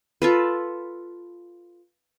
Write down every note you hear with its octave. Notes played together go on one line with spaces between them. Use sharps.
F4 A4 B4